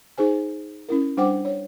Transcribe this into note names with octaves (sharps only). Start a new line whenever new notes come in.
D#4 G#4 C5 G#5
C#4 E4 A#4
G3 D4 C5 F#5 G5 D6
C#5